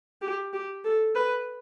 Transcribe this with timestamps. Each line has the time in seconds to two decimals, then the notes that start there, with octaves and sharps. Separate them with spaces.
0.22 G4
0.53 G4
0.84 A4
1.15 B4